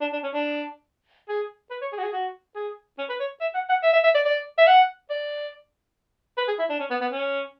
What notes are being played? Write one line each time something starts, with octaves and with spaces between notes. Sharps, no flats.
D4
D4
C#4
D4
G#4
B4
C#5
G#4
F#4
G#4
F#4
G#4
C#4
B4
C#5
E5
F#5
F#5
E5
E5
E5
D5
D5
E5
F#5
D5
B4
G#4
E4
D4
C#4
B3
B3
C#4